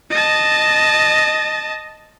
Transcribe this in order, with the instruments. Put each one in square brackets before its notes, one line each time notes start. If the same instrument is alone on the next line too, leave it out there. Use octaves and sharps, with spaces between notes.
[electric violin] D#5 A5